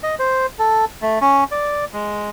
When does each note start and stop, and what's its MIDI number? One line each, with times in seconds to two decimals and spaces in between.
0.03 0.15 75
0.19 0.46 72
0.59 0.85 69
1.02 1.19 57
1.21 1.44 61
1.51 1.85 74
1.93 2.30 56